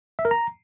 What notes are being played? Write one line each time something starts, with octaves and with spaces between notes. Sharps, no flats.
E5
A#4
A#5